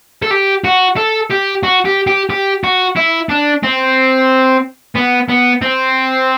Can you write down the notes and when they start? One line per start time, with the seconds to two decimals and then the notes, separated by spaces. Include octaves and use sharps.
0.22 A4
0.31 G4
0.64 F#4
0.97 A4
1.30 G4
1.63 F#4
1.86 G4
2.07 G4
2.30 G4
2.64 F#4
2.96 E4
3.29 D4
3.63 C4
4.96 B3
5.29 B3
5.62 C4